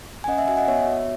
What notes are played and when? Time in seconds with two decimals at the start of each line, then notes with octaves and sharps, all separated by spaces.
0.24 G#5
0.28 C#4 D#5 F#5
0.38 E5 G#5
0.48 F#4 E5 G#5
0.57 D#5 F#5
0.68 B3 C#5 E5
0.87 F#4